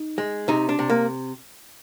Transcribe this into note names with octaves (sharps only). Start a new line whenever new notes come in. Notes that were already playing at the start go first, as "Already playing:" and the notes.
Already playing: D#4
G#3
C3 D#4
D4
C3
A#3